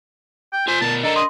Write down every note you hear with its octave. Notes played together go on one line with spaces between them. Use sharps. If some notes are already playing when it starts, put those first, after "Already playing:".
G5
F4 C5 G#5
B2 A#4 A5
D4 A4 A#4 D#5 A#5
D#5 C6